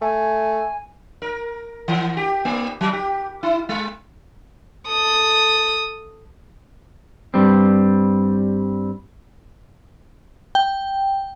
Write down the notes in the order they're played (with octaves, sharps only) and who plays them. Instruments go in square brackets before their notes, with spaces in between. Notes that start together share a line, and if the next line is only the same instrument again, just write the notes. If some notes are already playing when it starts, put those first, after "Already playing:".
[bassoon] A3 [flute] G#5
[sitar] A#4
E3
G4
A#3
F#3
G4
E4
G#3
[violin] A4 D#6
[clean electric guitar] G2 G3 C4
[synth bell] G5